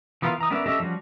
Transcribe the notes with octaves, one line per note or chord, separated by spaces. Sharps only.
E3 B3 F4 A#4
E3 A#5 D#6
B3 C#4 D4 A#4 E5
C#4 G4 A4 D#5 E5
F3 G3 C#4 F#4